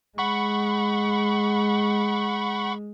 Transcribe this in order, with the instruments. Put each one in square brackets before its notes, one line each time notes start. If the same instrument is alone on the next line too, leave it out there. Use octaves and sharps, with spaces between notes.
[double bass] G#3 [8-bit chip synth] F#5 B5 C#6